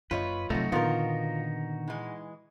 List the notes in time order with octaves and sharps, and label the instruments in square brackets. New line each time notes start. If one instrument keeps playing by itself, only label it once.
[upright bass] F#1 F#2 [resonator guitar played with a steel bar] F4 C#5 D#5 [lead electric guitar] B4
[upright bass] C3 F#3 [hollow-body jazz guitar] A3 [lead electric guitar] D#4 F#4
[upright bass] A#2 [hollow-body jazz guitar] D3 D#3 B3 [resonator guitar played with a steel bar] F4 A#4
[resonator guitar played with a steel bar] E3 G#3